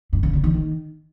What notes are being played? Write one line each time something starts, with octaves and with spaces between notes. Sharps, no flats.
G2
C#3
D3
D#3
D#3